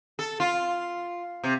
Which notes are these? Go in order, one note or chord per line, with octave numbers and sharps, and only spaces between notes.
A4
F4
C3